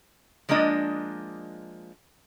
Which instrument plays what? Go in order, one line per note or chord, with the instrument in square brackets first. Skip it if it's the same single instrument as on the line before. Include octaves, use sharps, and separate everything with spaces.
[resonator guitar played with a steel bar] F3 G#3 A#3 D4 D#5